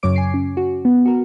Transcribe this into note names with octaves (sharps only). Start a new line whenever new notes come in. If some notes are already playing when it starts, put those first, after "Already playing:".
F#2 C#3 F#3 C#5 D6 D7
G#5 C7
C#4
F#4
B3
F#4 A#4